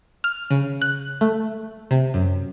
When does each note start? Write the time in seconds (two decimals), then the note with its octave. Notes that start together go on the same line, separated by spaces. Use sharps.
0.24 F6
0.51 C#3
0.82 F#6
1.21 A3
1.91 C3
2.14 F#2